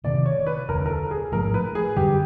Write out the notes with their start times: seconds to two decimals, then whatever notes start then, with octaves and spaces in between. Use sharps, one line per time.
0.04 F#1 F2 C3 D#3 D5
0.26 C#5
0.47 B4
0.68 E1 D2 D3 A#4
0.86 A#4
0.90 A4
1.11 G#4
1.32 A1 G#2 F3 A3 A#4
1.54 B4
1.75 G#4
1.96 F#2 D3 G3 G4